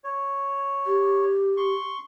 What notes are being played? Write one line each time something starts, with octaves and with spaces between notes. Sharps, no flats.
C#5
G4
C6 C#6